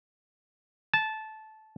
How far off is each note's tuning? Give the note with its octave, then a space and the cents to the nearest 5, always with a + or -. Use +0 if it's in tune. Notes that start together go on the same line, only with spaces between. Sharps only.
A5 -15